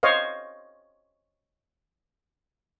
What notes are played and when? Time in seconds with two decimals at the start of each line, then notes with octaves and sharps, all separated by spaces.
0.03 C5 C#5 D#5 F5